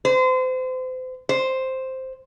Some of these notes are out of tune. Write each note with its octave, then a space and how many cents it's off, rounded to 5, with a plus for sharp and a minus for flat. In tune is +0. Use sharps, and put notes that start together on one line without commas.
C5 -35
C5 +0